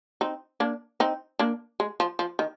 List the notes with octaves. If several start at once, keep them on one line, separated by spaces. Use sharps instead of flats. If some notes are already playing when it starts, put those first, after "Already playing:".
C4 D#4
A#3 D4
C4 D#4
A#3 D4
G#3
F3
F3
D#3